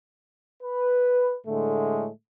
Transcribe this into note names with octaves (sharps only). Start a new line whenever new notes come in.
B4
A2 D3 G#3 A3